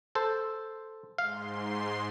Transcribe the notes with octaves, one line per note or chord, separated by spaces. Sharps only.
A4 C5
G#2 F5 C6